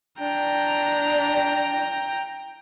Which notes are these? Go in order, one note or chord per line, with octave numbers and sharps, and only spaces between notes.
D4 G5 A#5